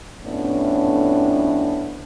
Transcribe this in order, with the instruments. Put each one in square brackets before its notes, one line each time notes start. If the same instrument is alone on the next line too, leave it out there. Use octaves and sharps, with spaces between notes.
[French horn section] F2 A2 B3 C#4 D4